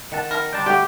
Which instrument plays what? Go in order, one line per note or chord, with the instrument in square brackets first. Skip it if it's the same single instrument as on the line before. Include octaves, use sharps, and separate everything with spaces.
[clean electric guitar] D#3 F#5 A5
[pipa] A#4
[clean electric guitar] D3 G3 D4 [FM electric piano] G5 A5 C6
[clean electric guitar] D3 G5 [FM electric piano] G3 A3 F#4 [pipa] G4